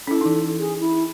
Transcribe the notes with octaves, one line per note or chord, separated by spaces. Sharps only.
C#4 E4 A4
E3 D#4
G#4
E4